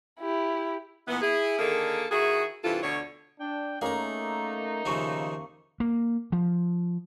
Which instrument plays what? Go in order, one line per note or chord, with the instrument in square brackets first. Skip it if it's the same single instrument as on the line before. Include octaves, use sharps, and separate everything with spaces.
[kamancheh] E4 G4
[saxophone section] A#2 E3 B3
E4 G#4
D3 D#3 A#3 G#4 A4
D#3 E4 F#4 G#4
G2 C3 E3 F4 A4
D2 B2 D3 C#5
[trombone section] D4 [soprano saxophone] G5
[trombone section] A3 [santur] A#3 C#4 A#4 [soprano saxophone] D#4 [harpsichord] G#4 A#5
[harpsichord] D#2 F3 A3 [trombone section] C#3 [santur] C#6 D#6
[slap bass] A#3
F3